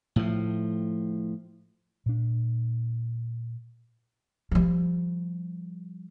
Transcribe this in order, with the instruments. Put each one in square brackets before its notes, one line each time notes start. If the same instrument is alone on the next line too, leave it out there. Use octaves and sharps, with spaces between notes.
[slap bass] A2 F3
[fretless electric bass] A#2 D4
[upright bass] F3 G3